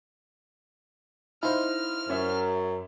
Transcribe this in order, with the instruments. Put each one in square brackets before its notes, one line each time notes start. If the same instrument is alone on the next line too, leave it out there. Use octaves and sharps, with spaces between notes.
[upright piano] D#4 D#5 F5 [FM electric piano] E4 C5 [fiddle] F6
[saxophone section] F#2 [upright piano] C#4 C#5 E5